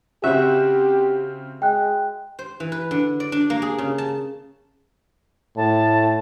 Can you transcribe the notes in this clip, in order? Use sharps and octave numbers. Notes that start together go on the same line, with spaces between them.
C#3 C4 F#4 G4 E5
G#3 G5 F#6
C5
E3
B4
D3
D5
D4
A#3
G#4
C#3
A5
A2 A5